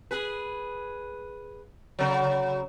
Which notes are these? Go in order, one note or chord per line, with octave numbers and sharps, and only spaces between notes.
G#4 B4
C#3 F#3